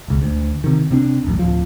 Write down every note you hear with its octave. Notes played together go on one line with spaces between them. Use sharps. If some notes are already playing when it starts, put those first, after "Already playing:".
E1 C#2
D2
C3 D#3
C3 C4 D4
D#1 A1 F#2
D1 F3